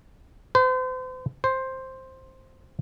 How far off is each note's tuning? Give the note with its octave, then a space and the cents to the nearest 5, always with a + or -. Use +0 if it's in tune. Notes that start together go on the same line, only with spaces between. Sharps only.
C5 -40
C5 +5